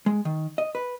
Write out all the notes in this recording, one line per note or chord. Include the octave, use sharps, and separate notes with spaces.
G#3
D#3
D#5
B4